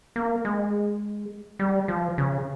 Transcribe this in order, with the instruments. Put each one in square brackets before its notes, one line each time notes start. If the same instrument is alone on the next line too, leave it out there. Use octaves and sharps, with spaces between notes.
[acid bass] A#3
G#3
G3
F3
C#3